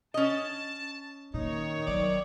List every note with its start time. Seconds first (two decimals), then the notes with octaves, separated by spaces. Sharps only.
0.14 C#4 D#5 A5
1.34 A#2 D#3 D#4 C#5
1.87 G1 F#3 D5